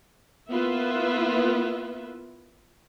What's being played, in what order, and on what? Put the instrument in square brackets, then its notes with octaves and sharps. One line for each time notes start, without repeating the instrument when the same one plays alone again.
[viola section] A#3 B3 E4 F4 B4 E5